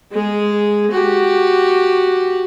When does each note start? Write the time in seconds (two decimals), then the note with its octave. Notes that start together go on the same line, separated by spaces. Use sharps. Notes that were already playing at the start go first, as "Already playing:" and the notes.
0.12 G#3 G#4
0.91 F#4 G4